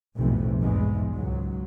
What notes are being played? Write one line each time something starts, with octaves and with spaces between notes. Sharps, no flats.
F1 B1 F#2 A2 C3 E3
B1 E2 G#2 E3 G#3
C#2 G#2 F#3